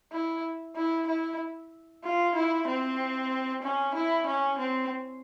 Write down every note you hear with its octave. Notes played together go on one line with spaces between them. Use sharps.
E4
E4
E4
F4
E4
C4
C#4
E4
C#4
C4